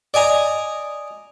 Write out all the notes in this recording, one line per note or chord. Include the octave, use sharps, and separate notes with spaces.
D5 D#5 G#5 A#5